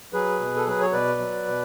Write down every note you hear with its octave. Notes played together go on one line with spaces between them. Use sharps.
F#3 G#4 B4
B2
A4
F#3 B4
C#5
B2 B4 D5
F#3
B2